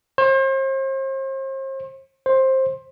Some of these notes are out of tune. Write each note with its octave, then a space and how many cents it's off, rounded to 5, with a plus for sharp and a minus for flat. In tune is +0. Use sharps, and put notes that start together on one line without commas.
C5 +40
C5 +15